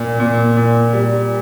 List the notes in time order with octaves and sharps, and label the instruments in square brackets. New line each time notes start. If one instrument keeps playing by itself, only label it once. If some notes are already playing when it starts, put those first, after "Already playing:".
Already playing: [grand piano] A#2
A#2
A#2
G3